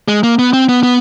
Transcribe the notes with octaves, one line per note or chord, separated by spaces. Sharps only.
G#3
A#3
B3
C4
B3
B3